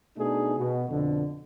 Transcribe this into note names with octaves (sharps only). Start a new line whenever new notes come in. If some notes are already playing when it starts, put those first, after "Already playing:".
B2 A3 D4 D#4 G#4
B2
F2 B2 D3